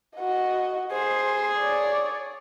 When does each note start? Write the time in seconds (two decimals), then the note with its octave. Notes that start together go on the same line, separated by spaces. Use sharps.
0.17 F#4 D#5
0.92 G#4 C5 C6
1.59 C#5 D5